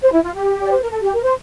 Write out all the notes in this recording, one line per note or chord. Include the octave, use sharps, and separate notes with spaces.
C5
E4
F4
G4
D5
C5
A#4
A4
G4
A#4
C5